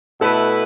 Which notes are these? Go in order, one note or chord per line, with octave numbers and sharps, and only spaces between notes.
B2 A3 E4 A4 B4